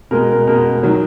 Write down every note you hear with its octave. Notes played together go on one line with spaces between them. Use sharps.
B2 G#3 A#4
A#4
B2 G#3 A#4
D#3 F#3